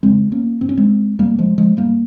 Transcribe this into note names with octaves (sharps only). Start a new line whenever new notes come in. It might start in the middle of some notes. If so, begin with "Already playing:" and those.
F2 C#3 G#3 C4
A#3 C#4
G2 C4
C#4
G#3 C4
F2 C3 G3 A#3
F3 G#3
F3 G#3
G2 G3 A#3